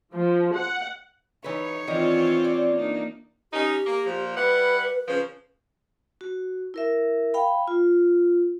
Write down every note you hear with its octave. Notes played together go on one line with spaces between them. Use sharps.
F3
F#5
E3 D#4 B4 C#5
D#3 E3 C4 F4 D5 D#5
D5
A#3 D4 D#4
C#4 D#4 G4
A#3
A#2 F3
G3 E4 B4 F#5
C#3 F3
F#4
E4 A#4 E5
F5 G5 B5
F4